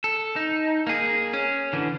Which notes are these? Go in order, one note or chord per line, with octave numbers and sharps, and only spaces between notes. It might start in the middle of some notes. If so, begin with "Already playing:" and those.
A4
D#4
A#3 G#4
C#4
D3 E3